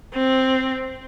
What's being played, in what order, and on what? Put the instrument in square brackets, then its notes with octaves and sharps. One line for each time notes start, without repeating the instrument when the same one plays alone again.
[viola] C4